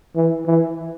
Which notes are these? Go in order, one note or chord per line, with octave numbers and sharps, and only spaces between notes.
E3
E3